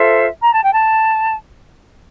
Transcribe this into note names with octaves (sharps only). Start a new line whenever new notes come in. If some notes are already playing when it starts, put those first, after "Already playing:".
Already playing: F4 A4 C5 E5
A#5
A5
G5
A5